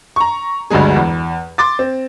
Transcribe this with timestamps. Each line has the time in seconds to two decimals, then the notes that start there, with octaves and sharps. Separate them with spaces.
0.16 A#5 C#6
0.70 G1 D2 G2 F#3 G#3 G#4
0.96 E2
1.58 C6 D6 A6
1.79 C4